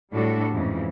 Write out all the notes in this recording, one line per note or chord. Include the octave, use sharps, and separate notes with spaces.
A2 G3 A3 D4 F#4 A4
F2 G#2 C#3 E3 F3